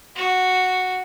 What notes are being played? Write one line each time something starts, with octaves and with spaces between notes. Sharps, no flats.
F#4